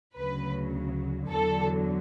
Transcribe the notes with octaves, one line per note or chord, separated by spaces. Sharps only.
D2 C#3 F#3 B4
E2 D3 F#3 A4